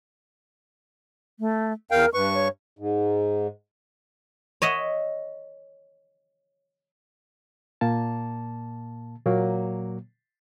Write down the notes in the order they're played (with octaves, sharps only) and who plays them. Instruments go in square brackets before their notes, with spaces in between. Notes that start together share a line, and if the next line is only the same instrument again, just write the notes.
[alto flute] A3
[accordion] E2 F5 G5 [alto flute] A#4
[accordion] G2 C#6 [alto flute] B4
[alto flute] C#5
[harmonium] G#2
[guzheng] C#5 D#5 E5 F#5
[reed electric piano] A#2 A#3 A5
A#2 F#3 A#3